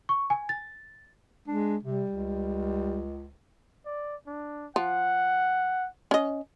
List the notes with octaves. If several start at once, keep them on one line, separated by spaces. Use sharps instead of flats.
C#6
G#5
A6
G#3 D4
C3 G3
C#2
D5
D4
F3 F#5
C#4 D#5